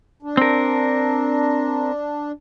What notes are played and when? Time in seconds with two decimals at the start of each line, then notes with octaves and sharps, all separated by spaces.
0.23 D4
0.37 C4 A#4